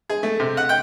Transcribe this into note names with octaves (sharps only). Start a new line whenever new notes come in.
G#4
A3
C3
F#5
G5